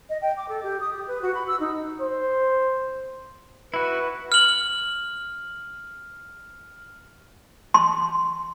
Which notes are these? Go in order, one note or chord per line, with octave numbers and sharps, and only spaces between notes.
D#5
G5
D6
A4
G4
D#6
G4
B4
F#4
B5
E6
D#4
C5
E4 F#4 B4
F6 F#7
C6